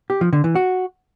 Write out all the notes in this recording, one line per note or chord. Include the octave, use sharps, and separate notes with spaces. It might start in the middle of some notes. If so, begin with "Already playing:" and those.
G4
F3
D3
E3
F#4